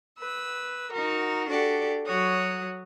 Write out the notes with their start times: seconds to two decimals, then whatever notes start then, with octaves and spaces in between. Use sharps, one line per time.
0.19 B4 E6
0.92 D#4 F#4 A#4
1.48 D4 F#4 G4 A4 D5
2.06 F#3 F#4 C#5 D#6